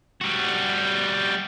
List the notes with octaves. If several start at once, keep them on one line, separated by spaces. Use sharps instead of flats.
G3 F#4